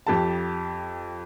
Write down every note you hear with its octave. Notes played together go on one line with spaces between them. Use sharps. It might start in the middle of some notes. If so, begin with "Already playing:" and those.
F2 G4 A5